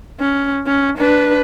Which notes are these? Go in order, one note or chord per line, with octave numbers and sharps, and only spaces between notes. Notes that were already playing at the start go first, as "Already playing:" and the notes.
C#4
C#4
D4 B4